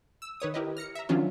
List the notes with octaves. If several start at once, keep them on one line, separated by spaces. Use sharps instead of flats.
E6
D#3 B4 C#5 D#6
E4 G4 A#4 B4 D#5
F6 A#6 C#7
E5 A#5
D#3 F3 F#3 C#4 D4 F4